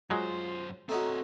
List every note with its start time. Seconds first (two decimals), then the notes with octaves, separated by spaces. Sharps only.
0.10 F#2 F#3 G#3 F4 C5
0.89 A3 C4 D#4 F#4 C#5 A#5